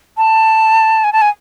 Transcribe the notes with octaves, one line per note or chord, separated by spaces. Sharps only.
A5
G#5
A5
G#5